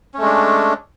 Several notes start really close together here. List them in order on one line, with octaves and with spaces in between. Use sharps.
C#4 A3 G#3 D4